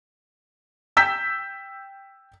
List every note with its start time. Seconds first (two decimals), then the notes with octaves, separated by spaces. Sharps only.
0.97 G5 E6 G6 B6